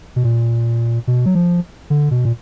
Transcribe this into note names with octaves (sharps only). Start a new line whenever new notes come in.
B2
A#2
B2
F#3
F3
D3
B2
A#2